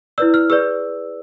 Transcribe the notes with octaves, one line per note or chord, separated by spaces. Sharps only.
E4 B4 D5 E6
F6
G#4 B4 D5 E6